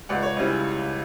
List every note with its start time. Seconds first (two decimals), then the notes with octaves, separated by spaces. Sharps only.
0.09 C#2 D5 F#5
0.23 C#5
0.37 C#3 G3 C#4 E4